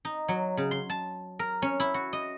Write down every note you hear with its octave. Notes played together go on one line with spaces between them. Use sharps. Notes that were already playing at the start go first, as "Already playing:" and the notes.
D#4
F#3
C#3
C6
A5
A#4
C#4
E4
F#4
D#5